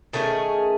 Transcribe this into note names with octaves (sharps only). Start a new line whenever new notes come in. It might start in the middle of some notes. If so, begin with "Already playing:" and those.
D#3 A3 C#4 G#4